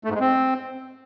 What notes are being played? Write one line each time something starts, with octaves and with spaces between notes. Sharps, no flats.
A3
G#2
G#3
C4